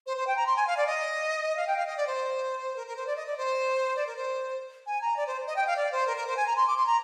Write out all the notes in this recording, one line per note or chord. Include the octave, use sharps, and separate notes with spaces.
C5
C5
G5
A#5
C6
G#5
F5
D5
D#5
F5
G5
F5
D#5
D5
C5
A#4
A#4
C5
D5
D#5
D5
C5
D5
A#4
C5
G#5
A#5
D5
C5
D#5
G5
F5
D5
C5
A#4
A#4
C5
G#5
A#5
C6
D6
C6
A#5